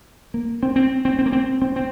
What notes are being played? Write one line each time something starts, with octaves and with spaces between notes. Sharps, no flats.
A#3
C4
C4
C4
C4
A#3
C4
C4
C4